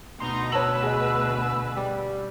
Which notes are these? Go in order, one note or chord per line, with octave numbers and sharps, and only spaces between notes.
D2 B2 D#4 A#5 C6
B4 C#5 A5 E6 F#7
G#4 D#5
G3